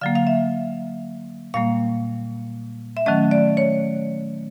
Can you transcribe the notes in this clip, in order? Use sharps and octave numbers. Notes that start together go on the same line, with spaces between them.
D3 F#3 A#3 F5
F5
E5
A#2 G3 A#3 F5
E5
D#3 F#3 A3 C#4 D#5
D5
C#5